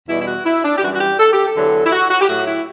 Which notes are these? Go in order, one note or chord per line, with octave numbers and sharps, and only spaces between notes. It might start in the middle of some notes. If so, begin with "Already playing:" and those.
E2 B2 G3 E4
E4
F#4
E4
D4
G4
F#2 E3 G3 F#4
F#4
G4
A4
G4
A4
E2 D3 F#3
E4
F#4
F#4
G4
A2 F#3 A3 F#4
E4